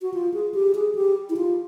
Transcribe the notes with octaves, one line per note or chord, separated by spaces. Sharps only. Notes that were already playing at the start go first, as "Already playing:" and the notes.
F#4
F4
G#4
G4
G#4
G4
E4
F4